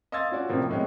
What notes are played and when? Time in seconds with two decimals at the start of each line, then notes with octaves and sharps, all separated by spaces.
0.12 D#5 F5 C6 E6 G#6 A6
0.31 C#4 F4 F#4 D5
0.49 F2 A2 C3 F3 A#3
0.69 A2 G#3 B3 C#4